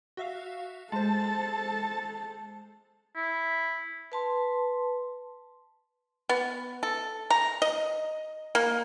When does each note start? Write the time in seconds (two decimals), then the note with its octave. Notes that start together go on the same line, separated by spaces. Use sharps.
0.17 F#4 E5 F5
0.92 G#3 A4 C5 A5
3.16 E4
4.12 B4 A5 C6
6.29 B3
6.83 A4
7.30 A#5
7.62 D#5
8.55 A#3